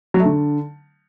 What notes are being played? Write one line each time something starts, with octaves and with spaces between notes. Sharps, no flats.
F#3
A3
D3